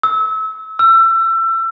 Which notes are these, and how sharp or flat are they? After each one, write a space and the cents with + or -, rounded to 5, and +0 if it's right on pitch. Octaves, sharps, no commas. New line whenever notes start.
E6 -30
E6 +30